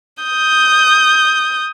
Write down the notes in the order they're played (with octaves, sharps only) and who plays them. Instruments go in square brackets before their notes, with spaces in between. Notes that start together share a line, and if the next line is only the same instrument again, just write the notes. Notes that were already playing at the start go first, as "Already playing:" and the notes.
[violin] D#6 G6